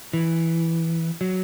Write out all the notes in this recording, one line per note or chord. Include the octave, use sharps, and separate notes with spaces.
E3
F#3